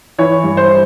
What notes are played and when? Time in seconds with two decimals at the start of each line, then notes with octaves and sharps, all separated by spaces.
0.18 E3 C#5
0.44 G2
0.57 C5